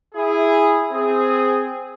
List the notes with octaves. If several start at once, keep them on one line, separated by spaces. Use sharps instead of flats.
E4 G#4
C4 G#4